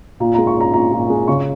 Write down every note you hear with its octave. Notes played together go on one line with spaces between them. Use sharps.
A#2 A#5
G#3 A#5
C#6
C#4 A#5
A#2 A#5
A#2
G#3
C#3 C#6